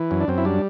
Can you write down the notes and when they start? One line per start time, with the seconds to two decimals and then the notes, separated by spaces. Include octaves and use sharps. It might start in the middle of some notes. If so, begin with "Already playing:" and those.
Already playing: E3
0.11 F#2
0.20 D4
0.28 F#2 C4
0.38 E4
0.45 G3 D4